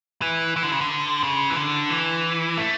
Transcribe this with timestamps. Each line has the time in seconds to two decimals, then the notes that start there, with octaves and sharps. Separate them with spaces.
0.21 E3
0.56 E3
0.63 D3
0.72 C#3
0.81 D3
1.23 C#3
1.50 E3
1.56 D3
1.90 E3
2.58 A3